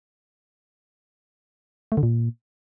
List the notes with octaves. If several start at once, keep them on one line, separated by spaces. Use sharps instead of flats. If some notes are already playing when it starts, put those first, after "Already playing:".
A3
D3
A#2